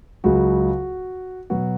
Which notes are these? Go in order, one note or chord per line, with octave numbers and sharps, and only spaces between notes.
C#2 C#3 F#3 F#4
B2 F#3 B3 F#4